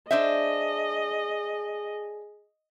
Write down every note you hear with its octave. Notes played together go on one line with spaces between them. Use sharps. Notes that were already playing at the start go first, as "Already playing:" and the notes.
D4 G#4 C5 D#5 E5